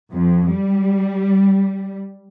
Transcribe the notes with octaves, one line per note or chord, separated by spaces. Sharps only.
F2
G3